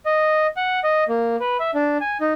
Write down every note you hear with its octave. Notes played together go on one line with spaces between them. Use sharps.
D#5
F#5
D#5
A#3
B4
E5
D4
G#5
D#4